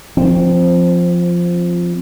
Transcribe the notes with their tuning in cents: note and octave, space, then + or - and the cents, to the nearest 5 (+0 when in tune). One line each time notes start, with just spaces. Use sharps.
F3 +0 C4 +0